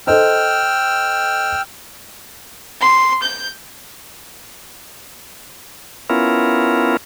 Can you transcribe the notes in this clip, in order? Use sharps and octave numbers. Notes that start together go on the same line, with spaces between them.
A4 C5 D#5 G5 E6 F6
C6
G6
B3 C#4 E4 F4 A#4